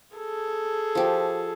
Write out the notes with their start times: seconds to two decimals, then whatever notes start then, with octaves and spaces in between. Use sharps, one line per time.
0.16 G#4 A4
0.95 F3 G4